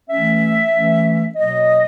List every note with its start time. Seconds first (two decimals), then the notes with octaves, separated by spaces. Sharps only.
0.10 E3 A3 C#4 E5
0.73 E3 A3 C#4
1.36 B2 F#3 A#3 D#5